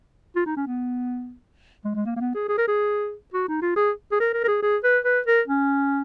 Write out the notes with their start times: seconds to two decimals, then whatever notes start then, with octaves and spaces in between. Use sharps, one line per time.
0.36 F4
0.46 D#4
0.56 C#4
0.67 B3
1.85 G#3
1.95 G#3
2.06 A#3
2.16 A#3
2.20 B3
2.35 G#4
2.49 G#4
2.58 A#4
2.67 G#4
3.34 F#4
3.48 D#4
3.62 F4
3.76 G#4
4.12 G#4
4.20 A#4
4.33 A#4
4.44 A#4
4.48 G#4
4.62 G#4
4.84 B4
5.05 B4
5.27 A#4
5.48 C#4